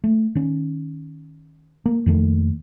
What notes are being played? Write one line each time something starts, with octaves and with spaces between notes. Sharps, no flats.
A3
D#3 C#4
A#3
F2 D#3 A3 A#3